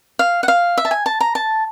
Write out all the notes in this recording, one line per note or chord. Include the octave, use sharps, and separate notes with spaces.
F5
F#5
F5
E5
A5
G#5
A5
A#5
A5